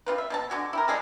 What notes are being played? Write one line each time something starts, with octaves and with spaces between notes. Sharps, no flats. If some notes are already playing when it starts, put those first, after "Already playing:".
C4 D4 F4 B4
E5
B2 C#4 A5
D3 F#4 G#5
E4 G4 A#4
G3 G#3 G#4 A4